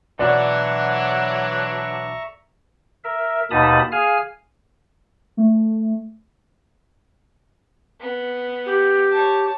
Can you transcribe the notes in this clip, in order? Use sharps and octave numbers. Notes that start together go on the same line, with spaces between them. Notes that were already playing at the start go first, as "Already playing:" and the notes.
B1 E3 F#3 D4 D5 E5 A#5 C#6
A#4 E5
D#2 B2 D#4 A5 B5 D#6
G#4 F5 G#5 F6
A3
B3
G4
C#5 A5